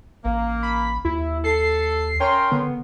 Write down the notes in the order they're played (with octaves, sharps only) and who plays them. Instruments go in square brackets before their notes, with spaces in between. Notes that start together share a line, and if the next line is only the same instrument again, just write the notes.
[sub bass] A1 [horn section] A#3
[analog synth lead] B5
[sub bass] D#2 [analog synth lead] E4
[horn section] A4 [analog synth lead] C7
[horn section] C#4 A#4 C6 [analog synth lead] G5
[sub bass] D3 [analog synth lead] B3